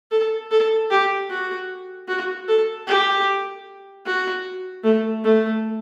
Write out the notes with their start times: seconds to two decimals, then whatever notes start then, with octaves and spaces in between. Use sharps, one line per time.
0.11 A4
0.51 A4
0.91 G4
1.30 F#4
2.08 F#4
2.48 A4
2.87 G4
4.06 F#4
4.84 A3
5.24 A3